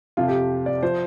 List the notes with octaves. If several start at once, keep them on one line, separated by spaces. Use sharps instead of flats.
F2 C3 F3 F4
G4
D5
F3 C5